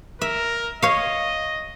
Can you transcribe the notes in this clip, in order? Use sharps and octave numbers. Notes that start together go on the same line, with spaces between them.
A#4 E5
C#5 D#5 F5